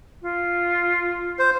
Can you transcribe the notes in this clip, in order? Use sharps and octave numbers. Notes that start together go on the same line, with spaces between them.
F4
C5